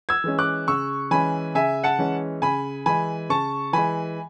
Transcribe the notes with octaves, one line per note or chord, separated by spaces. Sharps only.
E6 G#6
E3 G#3 C#4
D6 F#6
C#3 C#6 E6
E3 G#3 C#4 G#5 B5
C#3 E5 G#5
F#5 A5
E3 G#3 C#4
C#3 G#5 B5
E3 G#3 G#5 B5
C#3 A5 C#6
E3 G#3 G#5 B5